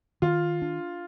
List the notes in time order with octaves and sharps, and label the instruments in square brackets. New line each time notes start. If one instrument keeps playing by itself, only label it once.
[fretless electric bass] D#3 [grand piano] F4
[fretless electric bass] D4